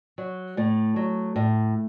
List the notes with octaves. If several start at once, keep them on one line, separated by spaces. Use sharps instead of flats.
F#3
A2 A3
F#3
A2